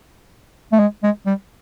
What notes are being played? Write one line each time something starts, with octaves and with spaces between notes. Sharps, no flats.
A3
G#3
G#3
G3